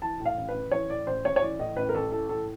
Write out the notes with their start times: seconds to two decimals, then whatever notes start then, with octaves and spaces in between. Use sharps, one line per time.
0.02 E3 A5
0.20 A2
0.26 F5
0.37 A1
0.49 B4
0.54 A1
0.71 E3 C#5
0.89 A2 D5
1.07 A1 C5
1.25 A1 C#5
1.36 C#5
1.42 E3 D5
1.59 A2 D#5
1.77 A1 B4
1.89 A#4
1.94 A1 A4
2.12 E3 A4
2.29 A2 A4